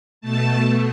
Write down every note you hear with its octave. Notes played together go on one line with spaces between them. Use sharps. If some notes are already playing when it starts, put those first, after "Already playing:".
B2 A3 A5